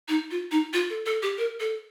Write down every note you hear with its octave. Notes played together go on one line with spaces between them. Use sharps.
D#4
F4
D#4
F4
A4
A4
G4
A#4
A4